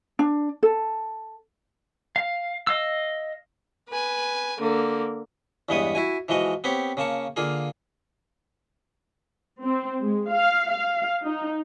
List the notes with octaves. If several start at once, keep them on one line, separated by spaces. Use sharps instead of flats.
D4
A4
F5
D#5 F5 E6
B4 G#5
D3 A#3
E2 G2 G#3 B3 C#5 D#6
E4 F#4 G#5
E3 F3 G#3 F#4 D#5
B3 C4 G4 C#5
C#3 A#3 A5 C#6
D3 A#3 F4 G#4
C4
G#3
F5
F5
D#4